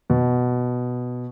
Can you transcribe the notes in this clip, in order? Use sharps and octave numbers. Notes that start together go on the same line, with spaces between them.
B2